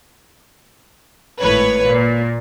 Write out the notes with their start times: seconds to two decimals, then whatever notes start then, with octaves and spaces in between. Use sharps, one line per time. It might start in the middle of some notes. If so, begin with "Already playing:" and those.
1.41 G#1 A2 B4 C#5
1.87 A#2